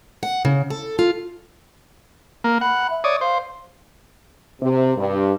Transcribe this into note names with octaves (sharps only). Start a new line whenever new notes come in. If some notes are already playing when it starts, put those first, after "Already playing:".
F#5
C#3
A4
F4
A#3
F#5 B5
E5
C#5 D5 D#6
C5 F5
C3
G2